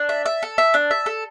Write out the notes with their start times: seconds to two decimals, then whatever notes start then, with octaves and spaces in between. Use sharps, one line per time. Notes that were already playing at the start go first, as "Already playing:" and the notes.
Already playing: D4
0.09 E5
0.26 E5
0.43 A4
0.58 E5
0.74 D4
0.91 E5
1.06 A4